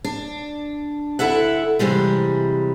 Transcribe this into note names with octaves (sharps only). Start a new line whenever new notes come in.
D4
D2 E4 A4 E5 F#5
C3 E3 G3 G#3